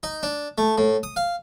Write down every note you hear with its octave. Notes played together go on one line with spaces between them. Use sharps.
D#4
D4
A3
A2
D#6
F5